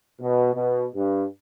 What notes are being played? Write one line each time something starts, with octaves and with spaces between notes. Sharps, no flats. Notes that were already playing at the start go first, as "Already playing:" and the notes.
B2
B2
G2